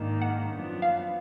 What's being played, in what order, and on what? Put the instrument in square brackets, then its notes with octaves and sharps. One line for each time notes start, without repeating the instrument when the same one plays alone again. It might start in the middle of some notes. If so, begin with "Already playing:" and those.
Already playing: [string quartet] G#2 D#3 A#3 D4
[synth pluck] F#5
[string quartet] F#2 F3 B3 D4
[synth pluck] F5